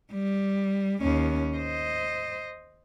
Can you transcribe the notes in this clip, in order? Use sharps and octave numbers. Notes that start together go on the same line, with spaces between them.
G3
D#2 C#4
C5 D#5